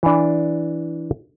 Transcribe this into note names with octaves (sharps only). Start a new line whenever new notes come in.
E3 D4